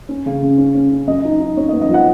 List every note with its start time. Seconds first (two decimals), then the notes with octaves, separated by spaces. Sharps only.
0.09 C#4
0.26 C#3
0.42 C#3
0.58 C#4
0.75 C#4
0.91 C#4
1.07 F#2 D#5
1.24 D#4
1.40 D#4
1.57 F#2 C#5
1.69 D#5
1.73 B3
1.81 D#5
1.89 F3
1.94 F#5